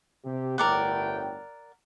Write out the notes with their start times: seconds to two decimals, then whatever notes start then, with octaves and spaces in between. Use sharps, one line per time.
0.23 C3 G4
0.58 G1 A2 A#4 D5 F#5 G5